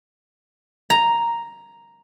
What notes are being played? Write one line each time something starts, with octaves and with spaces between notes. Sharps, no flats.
A#5